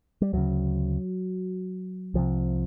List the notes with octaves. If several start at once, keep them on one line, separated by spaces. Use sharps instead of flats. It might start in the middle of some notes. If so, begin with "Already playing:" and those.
G3
D2 C#3 F#3
C2 C3 F3